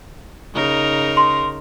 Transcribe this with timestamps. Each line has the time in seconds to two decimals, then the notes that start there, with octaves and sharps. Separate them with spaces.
0.54 C#3 D#4 A#4
1.17 C6